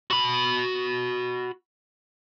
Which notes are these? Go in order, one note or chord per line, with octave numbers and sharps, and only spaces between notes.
F#4 B5